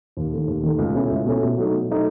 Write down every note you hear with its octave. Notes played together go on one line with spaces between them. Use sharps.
D#2
D#3 A3
D#2
D#3 A3
C#2
B2 A3 C#4 E4
C#2
B2 A3 C#4 E4
B2
F#3 A3 D#4
B2
F#3 A3 D#4